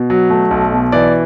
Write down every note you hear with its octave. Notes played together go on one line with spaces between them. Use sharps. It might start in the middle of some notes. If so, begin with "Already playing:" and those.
Already playing: B2
F#3
A3
B1
B2
E3 D5